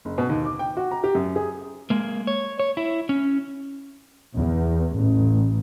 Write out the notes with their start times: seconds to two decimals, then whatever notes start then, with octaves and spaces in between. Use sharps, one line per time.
0.05 F#1
0.18 B2
0.29 D#2
0.45 D6
0.59 G5
0.77 F#4
0.91 A#5
1.04 G4
1.15 F#2
1.36 G#4
1.90 G#3 A#3
2.27 C#5
2.60 C#5
2.77 E4
3.09 C#4
4.35 E2
4.96 A1